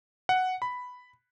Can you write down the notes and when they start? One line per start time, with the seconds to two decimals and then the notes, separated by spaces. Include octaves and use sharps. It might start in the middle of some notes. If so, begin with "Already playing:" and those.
0.29 F#5
0.62 B5